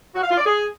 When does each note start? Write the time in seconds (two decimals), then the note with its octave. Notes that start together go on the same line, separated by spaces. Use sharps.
0.16 F#4
0.23 F5
0.30 F4
0.38 D5
0.45 G#4